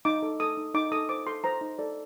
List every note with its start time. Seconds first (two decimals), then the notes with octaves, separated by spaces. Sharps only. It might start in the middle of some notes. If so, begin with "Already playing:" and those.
0.05 D#4 D6
0.23 A4
0.40 A4 D#6
0.57 D#4
0.74 D#4 D6
0.92 A4 D#6
1.09 C5 D6
1.27 A4 C6
1.44 C5 A#5
1.61 D#4
1.78 A4 D5